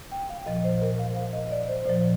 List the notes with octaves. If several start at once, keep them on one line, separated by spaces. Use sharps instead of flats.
G5
F5
A#2 F3 D#5
C5
A#4
F5
F5
D#5
D5
C5
A#2 F3 C5